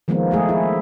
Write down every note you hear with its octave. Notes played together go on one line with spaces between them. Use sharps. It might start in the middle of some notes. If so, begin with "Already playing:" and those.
D#3 F3 G#3 A#3 B3
G#3 A3 G#4
E4